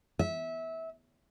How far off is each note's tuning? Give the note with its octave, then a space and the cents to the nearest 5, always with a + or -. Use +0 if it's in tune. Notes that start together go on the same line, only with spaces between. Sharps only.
E5 -20